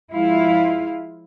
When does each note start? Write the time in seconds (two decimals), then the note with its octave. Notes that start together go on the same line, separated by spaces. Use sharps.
0.12 F3 G#3 E4 F4 F5